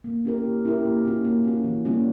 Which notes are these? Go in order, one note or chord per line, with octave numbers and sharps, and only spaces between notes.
A#3
C#4 E4 G4 A#4
A#3
C#4 E4 G4 A#4
A#3
C#4 F#4
A#3
C#4 F#4
E3
G3 A#3 C#4 F#4